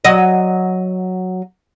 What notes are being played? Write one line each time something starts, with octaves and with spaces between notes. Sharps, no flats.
F#3 D#5